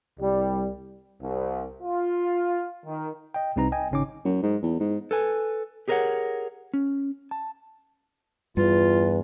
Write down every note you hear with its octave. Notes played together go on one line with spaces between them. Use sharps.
C2 G3
C2
F4
D#3
D#5 G5
C2 C3 C4 D#4 B4 A#5
D#5 G5 G#5
G#1 C#3 C#4 D#4 D6
F#2
G#2
E2
G#2
A4 B4 G#5
G4 G#4 A#4 B4 C#5 F#5
C#4
A5
E2 G2 F4 B4